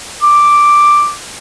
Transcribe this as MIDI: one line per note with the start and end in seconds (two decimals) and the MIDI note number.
0.22 1.12 86